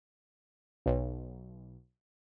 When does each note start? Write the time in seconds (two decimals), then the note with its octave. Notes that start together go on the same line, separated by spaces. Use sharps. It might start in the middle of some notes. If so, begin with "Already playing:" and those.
0.86 B1